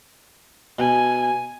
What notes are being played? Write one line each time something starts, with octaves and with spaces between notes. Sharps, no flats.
B2 G#5